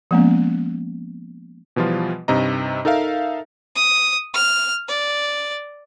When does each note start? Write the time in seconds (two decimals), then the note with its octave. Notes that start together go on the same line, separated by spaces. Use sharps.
0.11 F3 G#3 A#3 B3 C#4
1.76 B2 E3 F3 G3 F4
2.28 G2 C3 D#4 D#5 A#5
2.85 D#4 A4 A#4 E5 F5
3.75 D#6
4.34 F6
4.88 D5